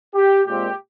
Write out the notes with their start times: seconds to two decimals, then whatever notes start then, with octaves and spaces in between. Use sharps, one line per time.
0.15 G4
0.46 A#2 G#3 C4 G4